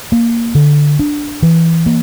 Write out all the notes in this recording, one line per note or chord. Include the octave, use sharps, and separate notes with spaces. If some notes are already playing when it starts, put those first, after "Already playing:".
A#3
D3
D4
E3
A#3